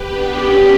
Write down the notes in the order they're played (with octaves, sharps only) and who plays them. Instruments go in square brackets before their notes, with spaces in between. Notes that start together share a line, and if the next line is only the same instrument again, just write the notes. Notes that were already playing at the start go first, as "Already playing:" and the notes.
Already playing: [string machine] G4 B4
B3 D4
[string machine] C#4 [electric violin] G4